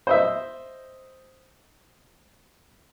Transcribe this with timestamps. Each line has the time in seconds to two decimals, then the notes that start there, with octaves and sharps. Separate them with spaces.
0.07 C5 D#5 E5